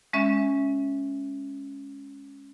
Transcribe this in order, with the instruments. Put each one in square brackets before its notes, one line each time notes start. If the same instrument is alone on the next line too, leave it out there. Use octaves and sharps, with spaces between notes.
[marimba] G#3 C#4 E5